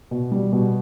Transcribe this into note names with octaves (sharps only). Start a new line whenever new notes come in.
B2
G3
B2